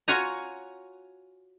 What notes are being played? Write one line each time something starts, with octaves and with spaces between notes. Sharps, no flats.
F4 F#4 C#5 G#5 A#5